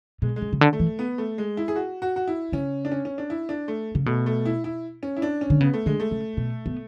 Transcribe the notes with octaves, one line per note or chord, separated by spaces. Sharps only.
B2 G#3
G#3
C#3
C#3
D3
A3
E3
B3
A3
G#3
E4
G#4
F#4
F#4
F#4
E4
C#3 C#4
D4
C#4
C#4
D4
E4
D4
A3
C#3
B2 A3
A3
E4
E4
C#4
E4
D4
C#4
D3
C#3 B3
A3
D3 G#3
A3
C#3
B2
B3